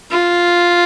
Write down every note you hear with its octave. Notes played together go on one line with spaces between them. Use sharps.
F4